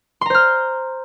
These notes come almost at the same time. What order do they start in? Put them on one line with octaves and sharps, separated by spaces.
C6 A#5 C5 F6